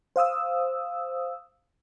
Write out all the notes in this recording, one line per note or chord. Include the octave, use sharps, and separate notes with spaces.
C5 F5 D#6 E6